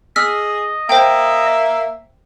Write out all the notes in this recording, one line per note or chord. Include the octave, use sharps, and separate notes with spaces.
G#4 D#5 E6 F6 B6
A#3 C5 E5 G5